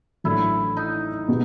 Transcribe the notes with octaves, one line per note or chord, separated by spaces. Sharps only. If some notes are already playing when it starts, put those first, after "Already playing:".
A1 A2 F#3 A3 D4 E4
D#4
B2 G#3 B3